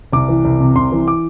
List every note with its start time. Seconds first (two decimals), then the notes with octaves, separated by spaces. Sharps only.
0.13 C2 D6
0.29 E3
0.45 C2
0.60 C3
0.76 C2 C6
0.92 E3
1.08 D6